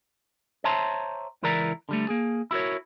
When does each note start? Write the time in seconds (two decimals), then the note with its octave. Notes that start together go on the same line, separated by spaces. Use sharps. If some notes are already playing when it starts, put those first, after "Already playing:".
0.64 C5 C#5 E5 A5 A#5 C6
1.43 C#2 E3 E4 A#4 D5 A#5
1.89 D3 G3 A3
2.09 A#3 G#4
2.51 E4 F#4 A#4 C#5